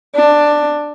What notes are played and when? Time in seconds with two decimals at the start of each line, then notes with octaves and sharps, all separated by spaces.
0.15 D4